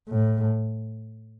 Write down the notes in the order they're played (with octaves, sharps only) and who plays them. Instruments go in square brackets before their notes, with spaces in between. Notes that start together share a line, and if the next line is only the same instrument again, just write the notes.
[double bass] A2